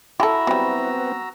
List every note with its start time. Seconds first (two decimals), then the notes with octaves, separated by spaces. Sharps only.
0.20 E4 F#4 G4 A4 A#5 E6
0.47 F#3 G3 B3 C4